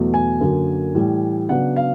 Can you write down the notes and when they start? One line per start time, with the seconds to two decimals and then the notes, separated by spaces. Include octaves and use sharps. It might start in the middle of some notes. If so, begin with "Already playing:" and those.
Already playing: E2 B2 F#3 A3
0.14 G#5
0.40 F#2 D3 F#3 A#3
0.95 A2 E3 G3
1.49 C#3 F#3 B3 D4 F#5
1.76 F5